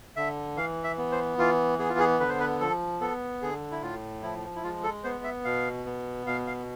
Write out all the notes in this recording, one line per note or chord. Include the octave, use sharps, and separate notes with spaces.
D3 E5
E3 F5
E5
B3
C5
E3 F4
B3 G#4
F4
G#4
D3 B4
C5
B4
F3 A4
B3 A4
D3 G#4
E4
A2 F4
F3 E4
E4
G#3 F4
A4
B3 C5
E5
B2 F5
B3
B2 F5
F5